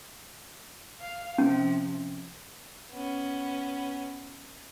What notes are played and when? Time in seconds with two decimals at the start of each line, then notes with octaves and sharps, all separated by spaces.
1.01 F5
1.38 C3 F3 C#4
2.92 B3 C#4